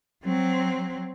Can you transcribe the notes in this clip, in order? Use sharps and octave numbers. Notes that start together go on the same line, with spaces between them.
F#3 C4